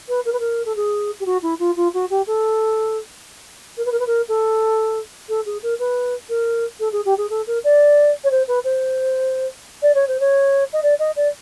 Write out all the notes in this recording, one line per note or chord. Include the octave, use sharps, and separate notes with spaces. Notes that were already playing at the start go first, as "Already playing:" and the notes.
B4
A#4
B4
A#4
A4
G#4
G4
F#4
E4
F4
F4
F#4
G4
A4
A#4
B4
A#4
B4
A#4
A4
A4
G#4
A#4
B4
A#4
A4
G#4
G4
G#4
A4
A#4
D5
C#5
C5
B4
C5
D5
C#5
C5
C#5
D#5
D5
D#5
D5